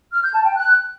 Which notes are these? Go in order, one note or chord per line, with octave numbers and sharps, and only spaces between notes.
F6
G6
A5
G5
F#6